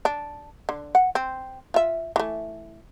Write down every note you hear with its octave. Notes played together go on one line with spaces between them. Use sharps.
D4
D3
F#5
C4
F4 E5
E3 A3